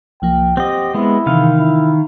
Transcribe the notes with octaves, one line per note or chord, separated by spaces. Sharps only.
C2 F3 A#3 G5
C4 G4 D#5 F#5
G#3 B3 E4
C3 D#3 E3 F5
E4